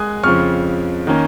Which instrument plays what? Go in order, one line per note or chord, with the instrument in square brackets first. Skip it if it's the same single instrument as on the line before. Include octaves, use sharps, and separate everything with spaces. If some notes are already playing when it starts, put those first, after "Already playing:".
Already playing: [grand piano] G#3 G#5 D#6 F#6
F2 C#3 F3 C#6 F6
D#3 A#3 C#4